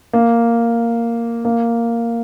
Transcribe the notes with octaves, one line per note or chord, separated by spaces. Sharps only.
A#3
A#3